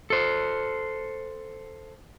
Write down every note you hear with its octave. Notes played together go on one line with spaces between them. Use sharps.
A4 C5